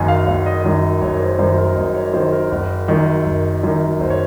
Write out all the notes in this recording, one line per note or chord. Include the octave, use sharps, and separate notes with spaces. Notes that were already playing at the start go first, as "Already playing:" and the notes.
Already playing: F#1 F#2 D#3 G#5
F5
F#1 F5
D#5
F#2 D#3
F#1 C#5
C5
F#2 D#3 C5
A#4
F#1 D#5
C#5
F#2 D#3 C5
A#4
F#1
F#2 D#3
F#1
F#2 D#3
F#1 C5
C#5